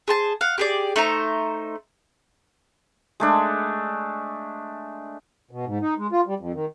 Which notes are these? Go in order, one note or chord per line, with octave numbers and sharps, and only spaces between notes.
G#4 C5 A5
F5 F#5
G4 G#4 D5
A3 D#4 C5 A#5
G#3 A3 D4
B2
G#2
D#4
G#3
F4
G3
F2
D#3